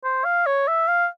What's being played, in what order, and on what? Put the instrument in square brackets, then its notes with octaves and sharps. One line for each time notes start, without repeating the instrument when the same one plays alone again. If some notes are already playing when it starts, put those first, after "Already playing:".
[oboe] C5
F5
C#5
E5
F5